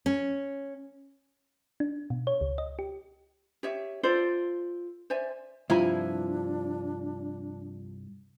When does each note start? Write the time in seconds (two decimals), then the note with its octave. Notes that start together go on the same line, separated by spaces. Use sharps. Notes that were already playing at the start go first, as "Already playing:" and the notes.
0.06 C#4
1.80 D4
2.10 B2
2.27 C#5
2.41 C#2
2.58 D#5
2.79 G4
3.63 G4 C#5 E5
4.03 F4 A4 C5 D5
5.10 C5 D5 E5 G#5
5.70 C2 G2 F3 D4 E4 G#5 A#5